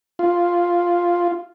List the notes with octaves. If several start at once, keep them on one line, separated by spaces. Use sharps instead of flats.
F4